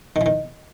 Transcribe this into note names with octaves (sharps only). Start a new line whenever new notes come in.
D#3
E3
D#3